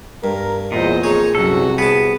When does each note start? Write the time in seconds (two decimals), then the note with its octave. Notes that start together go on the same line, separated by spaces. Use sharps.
0.24 G2 A#4
0.72 E2 A#2 C5 D#5
1.04 F2 D#4 G#4 A#4 C#5
1.35 C2 F#2 F#4 A4
1.78 B3 G#4 A5